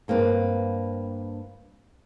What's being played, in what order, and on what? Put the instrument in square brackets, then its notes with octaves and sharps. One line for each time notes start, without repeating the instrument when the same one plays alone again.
[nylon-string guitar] G2 A#3 C4 B4